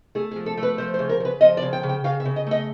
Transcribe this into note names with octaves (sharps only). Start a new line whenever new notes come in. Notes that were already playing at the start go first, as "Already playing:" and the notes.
A3 G#4
G#4
F3
A4
A3
B4
F3 C5
C5
C#3
A#4
C#3 B4
F3 D#5
D5
C#3
G5
C#3
G5
C#3 F5
E5
C#3
D#5
A3 D#5